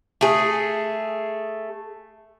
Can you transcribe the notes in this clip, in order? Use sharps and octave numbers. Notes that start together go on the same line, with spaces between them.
A3 G#4